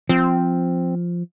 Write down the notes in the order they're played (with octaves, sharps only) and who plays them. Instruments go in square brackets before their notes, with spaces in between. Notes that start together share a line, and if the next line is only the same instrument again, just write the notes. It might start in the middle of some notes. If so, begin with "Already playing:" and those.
[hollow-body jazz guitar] F3 [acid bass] C4